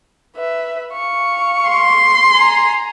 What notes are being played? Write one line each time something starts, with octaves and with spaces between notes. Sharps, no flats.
B4 E5
F5 C#6
C6
G#5 A#5